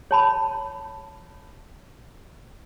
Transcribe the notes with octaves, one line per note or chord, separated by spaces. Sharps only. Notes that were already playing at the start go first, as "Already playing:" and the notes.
C#5 A5 B5